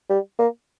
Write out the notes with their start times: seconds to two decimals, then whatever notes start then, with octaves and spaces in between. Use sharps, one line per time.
0.10 G3
0.39 A#3